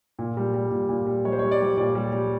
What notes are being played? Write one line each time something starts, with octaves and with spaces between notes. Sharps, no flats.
A#2
G3
G3
A#2
A#2
G3
G3 C#5
C5
C#5
G3
D5
G3
A#2 D5
G3
G3